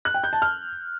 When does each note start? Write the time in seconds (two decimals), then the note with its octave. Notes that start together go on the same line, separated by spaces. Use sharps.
0.05 F#6
0.14 G5
0.24 G6
0.33 A5
0.42 F6